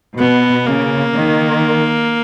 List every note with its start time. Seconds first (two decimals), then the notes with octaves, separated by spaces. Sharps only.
0.19 B2 B3
0.66 C#3 A#3
1.13 D#3